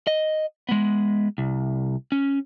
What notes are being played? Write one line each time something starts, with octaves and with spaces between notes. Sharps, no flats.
D#5
G#3 B3
C2
C#4